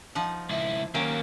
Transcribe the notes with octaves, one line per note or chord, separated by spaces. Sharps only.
F3 D#4 F#5
C#2 E4
D#2 F#3 A#3 C#4 G5